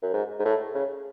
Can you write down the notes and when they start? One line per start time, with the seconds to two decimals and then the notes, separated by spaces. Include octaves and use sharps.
0.02 F#2
0.14 G#2
0.39 G#2
0.45 A2
0.75 C#3